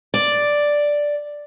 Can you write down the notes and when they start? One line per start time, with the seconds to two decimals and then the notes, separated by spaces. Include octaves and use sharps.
0.14 D5